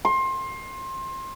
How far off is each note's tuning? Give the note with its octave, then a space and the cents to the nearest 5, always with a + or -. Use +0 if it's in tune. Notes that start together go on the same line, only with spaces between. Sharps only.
C6 +25